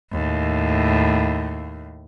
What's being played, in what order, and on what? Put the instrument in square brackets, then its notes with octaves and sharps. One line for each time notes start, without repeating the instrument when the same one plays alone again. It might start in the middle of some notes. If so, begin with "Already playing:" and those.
[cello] D#2 A2